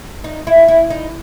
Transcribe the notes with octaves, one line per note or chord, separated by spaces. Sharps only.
D#4
E4
E4
D#4